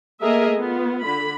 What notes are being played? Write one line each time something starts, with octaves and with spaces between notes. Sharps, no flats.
A3 A#3 G#4 A#4 D#5 E5
B3 F4
D3 B5